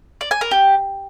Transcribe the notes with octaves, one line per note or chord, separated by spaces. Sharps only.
D5
G#5
A#4
G4